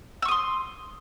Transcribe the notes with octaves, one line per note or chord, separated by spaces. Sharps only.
C6 C#6 D#6 E6